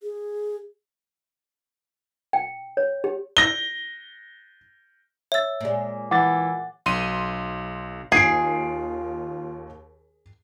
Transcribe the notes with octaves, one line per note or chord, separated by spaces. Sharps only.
G#4
G5
C#5
G4
A#6 G7
C#5 E5 E6 A6
A#2 G#3
E3 F#5 D6 A6
B1 C6 D#7
D#2 D#3 F4 G#4 C7 D7